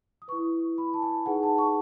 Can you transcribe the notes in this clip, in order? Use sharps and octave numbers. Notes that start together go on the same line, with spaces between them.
D#6
E4 B4 C#6
B5
A5
G#5
D#4 G#4 B4 F#5
A5
C#6